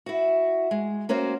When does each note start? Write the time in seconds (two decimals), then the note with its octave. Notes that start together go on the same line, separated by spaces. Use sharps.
0.06 E4 F#4
0.71 G#3
1.09 A#3 C#4 F#4 C5